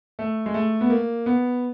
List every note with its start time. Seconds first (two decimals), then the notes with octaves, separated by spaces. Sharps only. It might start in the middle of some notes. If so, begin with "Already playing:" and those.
0.19 A3
0.46 G#3
0.54 A3
0.81 B3
0.90 A#3
1.26 B3